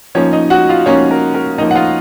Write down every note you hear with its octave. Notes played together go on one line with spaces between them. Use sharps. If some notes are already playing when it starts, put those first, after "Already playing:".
F3 A#3 C#4 D#4 C#5
D#4 D#5
F#4 F#5
F4 F5
F3 A#3 C#4 D#4 C#5
A#4
A#4
F3 A#3 D#4 D#5
F#5
F4 F5